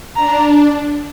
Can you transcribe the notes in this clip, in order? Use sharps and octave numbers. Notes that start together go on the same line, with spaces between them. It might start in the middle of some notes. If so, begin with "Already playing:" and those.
D4 A#5